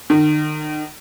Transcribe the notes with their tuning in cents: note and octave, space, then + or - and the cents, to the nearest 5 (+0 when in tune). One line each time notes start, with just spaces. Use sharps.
D#3 -40